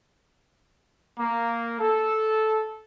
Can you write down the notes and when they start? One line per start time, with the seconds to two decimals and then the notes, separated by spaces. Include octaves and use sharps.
1.19 A#3
1.80 A4